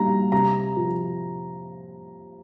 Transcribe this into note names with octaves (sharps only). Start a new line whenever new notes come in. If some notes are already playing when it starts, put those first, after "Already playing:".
Already playing: A#2 G3 A#5
C3 A#5
F3